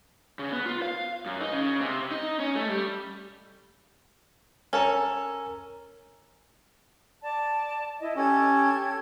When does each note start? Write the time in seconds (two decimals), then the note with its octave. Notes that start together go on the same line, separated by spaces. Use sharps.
0.39 C#3
0.52 B3
0.66 F4
0.82 F5
1.26 F#2
1.41 D#4
1.53 C#3
1.82 C3
2.11 D#4
2.40 C#4
2.56 A3
2.68 G3
4.73 C#4 A4 A#4 G#5 A#5
7.23 D5 A5
8.00 E4 D#5
8.16 C#4 G4 A4 G#6